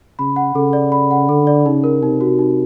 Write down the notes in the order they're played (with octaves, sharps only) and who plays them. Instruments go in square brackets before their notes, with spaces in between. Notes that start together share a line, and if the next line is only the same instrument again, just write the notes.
[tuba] C#3 [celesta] B5
[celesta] F#5
[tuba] C#3 [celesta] A4
[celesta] D5
B5
F#5
[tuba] D3 [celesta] A4
[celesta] D5
[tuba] C#3 [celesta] D#4
[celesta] A#4
[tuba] C3 [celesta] D#4
[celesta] F#4
D#4